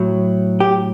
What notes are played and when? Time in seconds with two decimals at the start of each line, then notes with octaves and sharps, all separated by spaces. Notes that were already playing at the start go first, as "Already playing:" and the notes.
Already playing: A2 F#3
0.60 G4